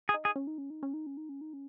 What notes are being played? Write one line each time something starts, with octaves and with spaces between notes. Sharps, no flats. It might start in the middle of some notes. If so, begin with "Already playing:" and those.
G#4
D#4
G#4
C#4
D#4
C#4
D#4
C#4
D#4
C#4
D#4
C#4
D#4
C#4